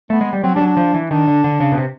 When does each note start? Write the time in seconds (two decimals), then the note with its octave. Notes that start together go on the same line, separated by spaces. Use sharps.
0.10 A3 B3
0.21 G#3
0.33 G3
0.43 F#3 C4
0.55 G3 D4
0.61 F#3
0.66 D4
0.77 F3
0.94 E3
1.10 D#3 D4
1.28 D3
1.44 D3
1.60 C#3
1.72 B2
1.78 C3